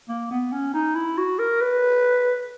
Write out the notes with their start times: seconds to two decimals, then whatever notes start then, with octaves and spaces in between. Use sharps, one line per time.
0.09 A#3
0.31 B3
0.52 C#4
0.74 D#4
0.95 E4
1.18 F#4
1.39 A#4
1.61 B4